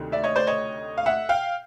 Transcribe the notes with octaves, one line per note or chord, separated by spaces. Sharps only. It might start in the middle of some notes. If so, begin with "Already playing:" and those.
Already playing: D2 C3 D#3
D5 E5
C#5 D#5
C5 D5
C#5 D#5
F5
E5 F#5
F5 G5